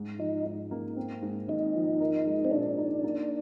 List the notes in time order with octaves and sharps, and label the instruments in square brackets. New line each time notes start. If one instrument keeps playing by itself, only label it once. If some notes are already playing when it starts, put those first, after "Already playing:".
Already playing: [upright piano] G#2
[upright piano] F3 [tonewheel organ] D#4
[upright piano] G#2
A#3
C4
G#2
[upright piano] G#1 [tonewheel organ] D#4
[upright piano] F3
A#4
G#3
[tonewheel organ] C4
[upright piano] A#2 [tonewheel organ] D4
[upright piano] D#4
A#3